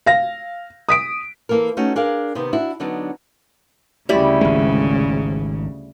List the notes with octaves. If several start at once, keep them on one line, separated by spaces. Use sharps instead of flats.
F5 A#6
D#6 B6 D7
E3 A#3 A4 A#4
A3 C#4 D#4 F#4
D4 G#4 A#4 F5
C3 D#3 B3
D4 E4 F#4
D3 F#3 B3 D4 D#4
D2 C#3 G3 E4
G#1 G#3